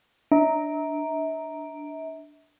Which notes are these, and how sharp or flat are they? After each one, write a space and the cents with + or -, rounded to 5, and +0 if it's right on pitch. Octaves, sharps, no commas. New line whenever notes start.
D4 +0 E5 -35 A#5 +0